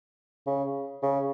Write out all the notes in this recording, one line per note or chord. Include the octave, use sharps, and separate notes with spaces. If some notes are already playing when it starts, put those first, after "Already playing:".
C#3
C#3